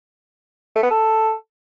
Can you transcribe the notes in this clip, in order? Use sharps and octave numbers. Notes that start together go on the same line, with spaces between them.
A3
B3
A4